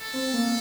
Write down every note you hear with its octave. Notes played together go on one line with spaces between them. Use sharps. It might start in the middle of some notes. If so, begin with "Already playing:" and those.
Already playing: A4
C4
A#3